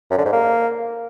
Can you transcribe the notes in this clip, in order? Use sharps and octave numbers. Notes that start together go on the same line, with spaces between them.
F#2
D3
G#2
A#3